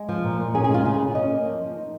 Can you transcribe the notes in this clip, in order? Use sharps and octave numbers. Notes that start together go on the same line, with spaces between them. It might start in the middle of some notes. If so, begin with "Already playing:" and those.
Already playing: G#3
F3
A#2
A#2
C#4 G#4
G#4
G#3
F4
C#3 G#4
C#3
C#4 D#5
A#3
F3
F3
D#4